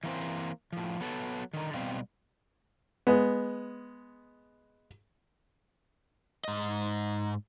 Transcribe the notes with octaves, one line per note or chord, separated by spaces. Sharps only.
E3 A#3 C4 C5
A2 F3
F#3 B3 A4
D3 D#3
B2 G3 C4 F5
G#3 B3
G#2 D#5